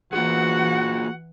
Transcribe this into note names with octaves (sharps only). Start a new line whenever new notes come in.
E3 A#3 F4 F#4 G#4 F#5